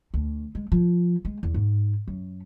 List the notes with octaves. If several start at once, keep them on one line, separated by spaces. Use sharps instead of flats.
D2
G#3
F3
G#3
E2
G#2
F#2